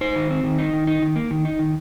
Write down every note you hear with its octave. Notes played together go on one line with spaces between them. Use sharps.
D#4 C5
D#3
C4
D#3
D#4
D#3
D#4
D#3
A#3
D#3
D#4
D#3